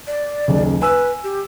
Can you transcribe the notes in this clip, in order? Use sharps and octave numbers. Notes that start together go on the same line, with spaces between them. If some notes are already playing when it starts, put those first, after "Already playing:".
D5
D#1 B1 C#3
B4 G#5 E6
G4